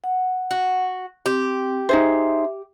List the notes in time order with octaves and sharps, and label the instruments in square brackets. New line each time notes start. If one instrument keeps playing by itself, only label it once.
[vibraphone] F#5
[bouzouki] F#4
[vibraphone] C4 [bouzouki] G4
[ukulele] D#4 G#4 C5 [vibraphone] E5